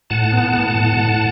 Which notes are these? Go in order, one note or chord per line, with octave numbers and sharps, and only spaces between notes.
A2 F#5 A5
B3
A2
A2
A2